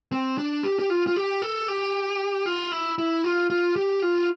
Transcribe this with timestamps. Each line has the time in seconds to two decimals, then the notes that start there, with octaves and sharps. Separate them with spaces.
0.12 C4
0.38 D4
0.63 G4
0.79 G4
0.90 F4
1.07 F4
1.16 G4
1.42 A4
1.68 G4
2.46 F4
2.72 E4
2.98 E4
3.24 F4
3.50 F4
3.76 G4
4.02 F4